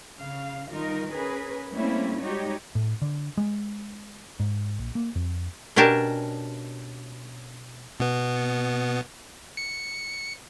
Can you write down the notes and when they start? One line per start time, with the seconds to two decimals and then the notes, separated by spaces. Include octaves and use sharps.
0.21 C#3 F5
0.72 D#3 G3 D#4 F4 A#4
1.12 C#4 G#4 A#4 B4
1.72 G3 A3 A#3 C4 C#4 E4
2.20 G3 G#3 D#4 F#4 G4 C#5
2.75 A2
3.02 D3
3.37 G#3
4.40 G#2
4.79 A#1
4.95 A#3
5.16 F2
5.76 B2 C#4 D4 G4 A#4 A5
8.00 B2 B3
9.57 C#7